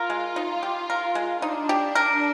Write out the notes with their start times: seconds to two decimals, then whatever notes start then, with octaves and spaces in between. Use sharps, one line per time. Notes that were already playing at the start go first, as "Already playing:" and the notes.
Already playing: F4 A#4
0.10 G#3
0.36 D#4
0.63 G4
0.90 A#4
1.15 G#3
1.42 D4 D#4
1.69 G4
1.95 A#4